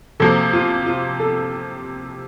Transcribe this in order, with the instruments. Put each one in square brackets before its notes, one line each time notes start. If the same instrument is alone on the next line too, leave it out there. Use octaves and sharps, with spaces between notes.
[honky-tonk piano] C3 F3 A#3 [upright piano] A4
[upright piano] F4
F4
A4